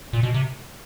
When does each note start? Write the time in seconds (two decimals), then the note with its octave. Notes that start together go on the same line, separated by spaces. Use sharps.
0.13 A#2
0.23 B2
0.34 C3